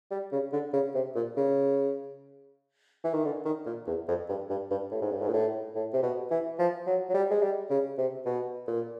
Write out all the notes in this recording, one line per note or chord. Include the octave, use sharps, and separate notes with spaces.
G3
C#3
D3
C#3
C3
A#2
C#3
E3
D#3
D3
D#3
A#2
E2
F2
G2
G2
G2
A2
G#2
G2
G#2
A#2
A2
A2
C3
B2
E3
F3
F#3
F#3
G3
G#3
G3
C#3
C3
B2
A#2